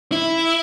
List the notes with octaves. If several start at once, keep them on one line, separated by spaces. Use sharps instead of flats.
E4